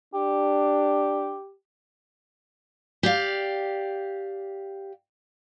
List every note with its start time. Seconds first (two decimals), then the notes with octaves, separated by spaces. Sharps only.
0.14 D4 G4
3.03 G4 D5 F5